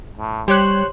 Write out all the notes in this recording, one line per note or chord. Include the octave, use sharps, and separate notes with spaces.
A2
G3 G4 C5 C#5 F#6